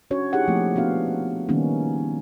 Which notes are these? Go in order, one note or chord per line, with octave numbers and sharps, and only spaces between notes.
C#4 D4 F#4 C#5
D#4 E4 G4 G#4 F#5
F3 A3 A#3 C4
B3 D4 F#4 F5
D#3 G3 A#3 B3 C#4 D#4